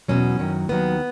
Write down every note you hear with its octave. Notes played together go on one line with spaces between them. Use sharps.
E2 B2 F#3 C#4
F#2 D#3 F#3
D#2 D#3 F#3 B3